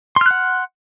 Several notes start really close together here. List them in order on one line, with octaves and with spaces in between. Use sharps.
C6 F6 F#6 F#5